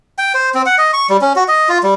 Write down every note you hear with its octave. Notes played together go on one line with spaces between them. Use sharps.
G5
C5
C4
F#5
D#5
C#6
G3
C#4
F#4
D#5
F4
G3